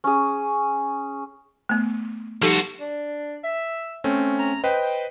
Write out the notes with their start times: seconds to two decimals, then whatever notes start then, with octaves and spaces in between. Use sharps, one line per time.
0.04 C#4 G#4
1.69 A3 B3
2.42 F3 D#4 F#4 G4 A4
2.80 D4
3.44 E5
4.04 A3 C4 C#4
4.39 A#5
4.64 B4 C5 D#5 G5